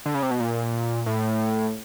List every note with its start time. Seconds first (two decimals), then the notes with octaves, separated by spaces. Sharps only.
0.06 D3
0.14 C#3
0.22 C3
0.31 B2
0.40 A#2
1.06 A2